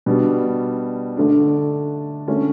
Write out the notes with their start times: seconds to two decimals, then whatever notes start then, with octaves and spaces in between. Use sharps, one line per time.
0.06 B2 G3 D4
1.17 D3 A3 D4
2.28 D3 A3 C#4